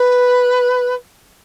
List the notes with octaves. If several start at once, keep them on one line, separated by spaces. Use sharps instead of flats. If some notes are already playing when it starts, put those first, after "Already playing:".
Already playing: B4